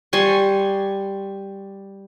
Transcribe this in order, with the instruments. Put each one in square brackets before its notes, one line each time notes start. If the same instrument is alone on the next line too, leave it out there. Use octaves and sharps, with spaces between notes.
[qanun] G3 G#5 C6 C#6